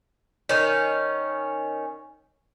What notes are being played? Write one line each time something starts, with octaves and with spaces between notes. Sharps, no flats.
D#3 C#4